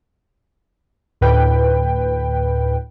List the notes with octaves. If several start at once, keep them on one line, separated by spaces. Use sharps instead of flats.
D2 A2 B4 G5